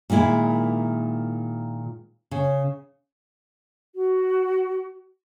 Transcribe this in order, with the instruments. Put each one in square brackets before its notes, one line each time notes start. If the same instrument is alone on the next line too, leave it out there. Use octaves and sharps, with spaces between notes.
[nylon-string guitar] A#2 D#3 G#3 E4
C#3
[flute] F#4